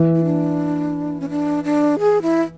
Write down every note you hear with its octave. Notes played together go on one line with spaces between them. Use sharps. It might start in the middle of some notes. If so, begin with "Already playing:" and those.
Already playing: E3
E4
D4
C#4
D4
D4
G#4
E4